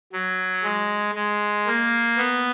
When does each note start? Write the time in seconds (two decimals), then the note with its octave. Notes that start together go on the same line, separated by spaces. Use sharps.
0.13 F#3
0.64 G#3
1.15 G#3
1.67 A#3
2.17 B3